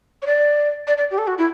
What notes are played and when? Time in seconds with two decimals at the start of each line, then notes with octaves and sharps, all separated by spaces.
0.22 C#5
0.26 D5
0.87 D5
0.98 D5
1.11 G4
1.18 A4
1.27 F#4
1.38 E4